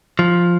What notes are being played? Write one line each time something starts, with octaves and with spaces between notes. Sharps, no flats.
F3